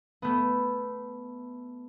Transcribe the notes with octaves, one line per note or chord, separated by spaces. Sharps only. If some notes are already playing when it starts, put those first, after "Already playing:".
A3 B3